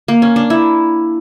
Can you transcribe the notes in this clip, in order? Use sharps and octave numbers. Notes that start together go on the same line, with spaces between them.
A#3
C#4
D4
E4